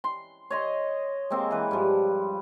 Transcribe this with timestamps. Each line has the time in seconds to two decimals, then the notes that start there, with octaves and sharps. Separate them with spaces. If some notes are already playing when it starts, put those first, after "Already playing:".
0.04 C6
0.50 C#5 D#5 C6
1.30 G#3 A#3 C4
1.51 E3 B4
1.71 G2 F3